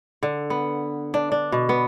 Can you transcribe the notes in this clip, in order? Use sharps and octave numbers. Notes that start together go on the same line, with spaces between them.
D3
B3
D4
D4
B2
B3